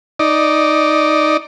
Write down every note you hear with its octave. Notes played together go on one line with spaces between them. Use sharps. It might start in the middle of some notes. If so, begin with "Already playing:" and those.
D#4 D5